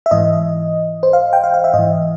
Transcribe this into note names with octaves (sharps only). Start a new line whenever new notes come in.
E5
G#2 E3 D#5
C5
F5
G5
F5
F5
E5
G#2 E3 D#5